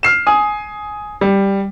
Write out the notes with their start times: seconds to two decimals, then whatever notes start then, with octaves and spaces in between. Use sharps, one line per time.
0.03 F6 C7 E7
0.27 G#5 D#6
1.21 G3